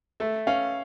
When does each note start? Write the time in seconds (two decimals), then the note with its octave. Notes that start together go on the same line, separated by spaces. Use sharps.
0.20 A3 E5
0.47 C#4 F5